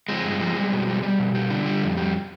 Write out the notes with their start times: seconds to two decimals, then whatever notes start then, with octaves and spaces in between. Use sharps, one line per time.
0.08 F3 G#3 C4
0.24 G2
0.41 F3
0.56 G3
0.72 B2
0.88 G3
1.03 G3
1.19 B2
1.35 G3
1.50 D3
1.66 G3
1.82 F2
1.97 G3